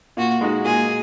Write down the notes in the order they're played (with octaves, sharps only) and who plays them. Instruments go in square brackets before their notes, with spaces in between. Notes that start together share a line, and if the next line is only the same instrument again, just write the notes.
[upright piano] A#2 [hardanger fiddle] F#4
[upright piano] G#3 D#4 F#4
[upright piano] A#2 [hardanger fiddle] G#4